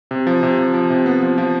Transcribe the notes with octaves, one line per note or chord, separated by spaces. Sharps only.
C3
F3
C3
F3
F3
C3
B3
F3
F3